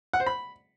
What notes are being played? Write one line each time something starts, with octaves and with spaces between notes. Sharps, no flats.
F#5
C5
B5